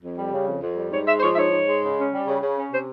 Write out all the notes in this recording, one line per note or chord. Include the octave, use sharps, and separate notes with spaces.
F2
G3
C#3
F2
F2
G3
G#2 C#5
G#3 E5
C5
F3 C#5
E5
G#2 C#5
G#2
G#3
C#3
C#4
G3
C#3
C#3
C#4
C3 C5